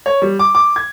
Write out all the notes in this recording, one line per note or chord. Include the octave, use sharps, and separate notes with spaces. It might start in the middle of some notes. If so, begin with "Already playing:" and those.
C#5
G3
D6
D6
G#6